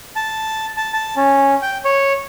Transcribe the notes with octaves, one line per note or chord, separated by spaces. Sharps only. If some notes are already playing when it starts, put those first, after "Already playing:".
A5
A5
A5
C#4
G5
C#5